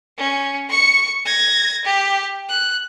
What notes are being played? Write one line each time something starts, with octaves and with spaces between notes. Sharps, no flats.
C#4
C#6 C#7
G#6 A#6
G4
F#6